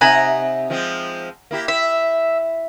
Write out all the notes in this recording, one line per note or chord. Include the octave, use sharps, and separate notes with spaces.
C3 D#4 E5 F#5 G#5 A#5
F3 G#3 C4
A#3 E4 G4
E4 E5